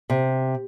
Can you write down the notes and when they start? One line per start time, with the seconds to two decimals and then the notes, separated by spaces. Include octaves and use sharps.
0.10 C3